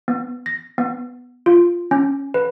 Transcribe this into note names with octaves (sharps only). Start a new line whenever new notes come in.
B3
A#6
B3
F4
C#4
B4